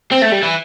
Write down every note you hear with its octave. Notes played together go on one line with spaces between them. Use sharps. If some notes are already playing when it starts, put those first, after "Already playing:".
C4
A3
G3
E3